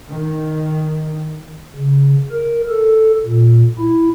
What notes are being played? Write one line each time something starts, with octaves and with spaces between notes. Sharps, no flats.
D#3
C#3
A#4
A4
A#2
E4